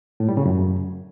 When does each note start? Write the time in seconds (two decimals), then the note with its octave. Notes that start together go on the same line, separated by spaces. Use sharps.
0.20 A2
0.29 G3
0.37 C#3
0.46 F#2